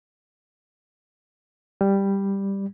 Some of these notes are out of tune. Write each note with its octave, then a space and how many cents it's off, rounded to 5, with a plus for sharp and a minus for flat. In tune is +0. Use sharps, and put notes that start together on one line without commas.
G3 +5